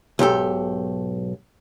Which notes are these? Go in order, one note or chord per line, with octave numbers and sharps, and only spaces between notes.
B1 G#2 G4 A4